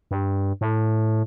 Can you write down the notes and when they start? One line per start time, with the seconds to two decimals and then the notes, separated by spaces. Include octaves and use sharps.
0.11 G2
0.61 A2